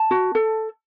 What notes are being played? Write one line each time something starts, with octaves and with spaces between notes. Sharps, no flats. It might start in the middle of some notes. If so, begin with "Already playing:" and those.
Already playing: A5
F#4
A4